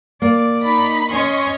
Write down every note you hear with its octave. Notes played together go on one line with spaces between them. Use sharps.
A#3 D5
D#4 B5 B6
C#4 C#5 D#5 C6 C#6